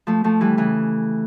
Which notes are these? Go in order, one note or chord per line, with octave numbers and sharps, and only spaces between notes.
F3 A3
F3 A3
E3 G3
C#3 E3